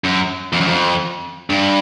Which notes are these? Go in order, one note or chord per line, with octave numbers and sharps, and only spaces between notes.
F#2
F2
F#2
F2
G2